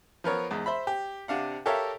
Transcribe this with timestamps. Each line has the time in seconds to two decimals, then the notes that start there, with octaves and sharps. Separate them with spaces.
0.24 F3 B3 A#4 C#5
0.51 E2 G#2
0.66 C5 E5 B5
0.87 G4
1.28 C3 D4 F5 F#5
1.66 G4 A4 A#4 C#5 E5 F5